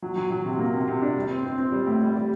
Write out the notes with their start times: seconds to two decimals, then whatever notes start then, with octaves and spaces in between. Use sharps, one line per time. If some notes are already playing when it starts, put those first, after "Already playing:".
0.02 F#3
0.16 F#3
0.30 F#3
0.45 C3
0.59 A#3
0.74 C3
0.88 C3
1.01 D4
1.16 G3
1.30 C4
1.44 C4
1.58 C4
1.72 G3
1.87 A2
2.01 G3
2.16 G3